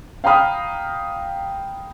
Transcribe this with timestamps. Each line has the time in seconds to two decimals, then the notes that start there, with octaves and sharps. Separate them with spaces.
0.24 F5 G5 A#5 B5 D#6 F6